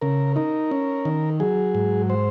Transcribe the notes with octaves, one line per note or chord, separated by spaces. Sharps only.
C#3 A#4
D#4 A#4
C#4
D#3
F#3 G#4
G#2
C5